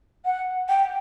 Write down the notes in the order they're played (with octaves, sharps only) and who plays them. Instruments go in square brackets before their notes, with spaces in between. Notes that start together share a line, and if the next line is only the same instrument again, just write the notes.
[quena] F#5
G5